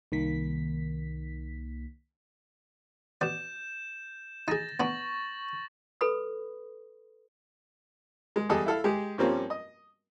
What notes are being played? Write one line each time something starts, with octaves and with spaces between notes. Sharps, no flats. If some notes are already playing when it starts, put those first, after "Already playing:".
C2 D#3 A#3 B6
B2 D5 G6 E7
D#4 G#4 A6 A#6
B3 D4 C#6 A6 F#7
A4 B4 B5 D#6
G#3
E2 G3 G#4 A4 D#5
E4 A4 F5
G#3 G4 G#4
G2 F3 G3 A#3 C4 C#4
D#5